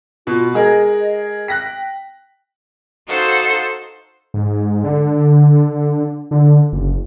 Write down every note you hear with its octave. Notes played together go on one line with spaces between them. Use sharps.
B2 F4
G#3 G#4 A#4 D#5
G5 F#6 A#6 B6
D#4 F#4 A4 C5 F5 F#5
G#2
D3
D3
F#1